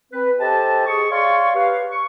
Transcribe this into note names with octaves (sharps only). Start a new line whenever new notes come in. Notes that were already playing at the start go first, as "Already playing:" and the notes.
C4 B4
G4 A4 C5 D#5 G5 A5
G#4 C#6
C#5 D5 F5 C6 C#6
G4 B4 F5
C#6